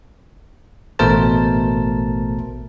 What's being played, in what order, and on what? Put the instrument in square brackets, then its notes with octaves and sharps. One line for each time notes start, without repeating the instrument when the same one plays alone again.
[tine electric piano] A1 B2 A3 A#4 C5 A5